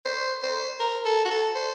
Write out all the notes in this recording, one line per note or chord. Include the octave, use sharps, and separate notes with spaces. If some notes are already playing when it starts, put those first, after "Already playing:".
C5
C5
A#4
A4
F#4
A4
C5